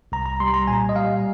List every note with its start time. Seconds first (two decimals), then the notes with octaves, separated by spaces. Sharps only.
0.12 C2 A#5
0.26 A#5
0.40 G3 C6
0.54 A#5
0.68 A#2 G#5
0.89 D#5
0.95 G3 F5